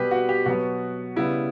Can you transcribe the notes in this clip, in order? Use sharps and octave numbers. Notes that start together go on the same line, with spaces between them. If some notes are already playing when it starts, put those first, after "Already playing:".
Already playing: B2 G3 B3 G4 B4
F#4
G4
B2 F#3 B3 F#4
C#3 G3 B3 E4